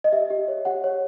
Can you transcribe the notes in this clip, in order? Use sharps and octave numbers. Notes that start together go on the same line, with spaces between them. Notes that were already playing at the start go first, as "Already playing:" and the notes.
D#5
G4 E5
G4
C#5
G4 F#5
C#5